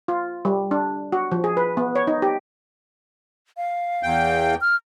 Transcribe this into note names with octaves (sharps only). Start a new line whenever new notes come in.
F4
G3
D4
F#4
F3
G#4
B4
B3
C#5
D#4
G4
F5
E2 G5
F6